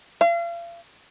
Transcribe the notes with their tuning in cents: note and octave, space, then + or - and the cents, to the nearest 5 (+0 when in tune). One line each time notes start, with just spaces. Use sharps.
F5 -40